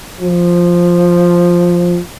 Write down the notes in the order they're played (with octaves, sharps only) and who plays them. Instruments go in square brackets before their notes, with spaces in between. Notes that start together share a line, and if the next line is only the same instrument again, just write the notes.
[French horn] F3